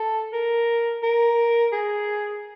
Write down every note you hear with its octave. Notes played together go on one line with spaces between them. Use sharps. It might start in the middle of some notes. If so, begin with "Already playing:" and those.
Already playing: A4
A#4
A#4
G#4